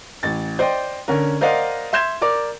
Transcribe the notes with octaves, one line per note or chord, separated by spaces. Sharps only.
A1 A6
C5 D5 D#5 G5
D3 C#4 A#4
A#4 C5 D5 D#5 F5 F#5
E5 C6 G6 G#6 E7
A#4 D5 D6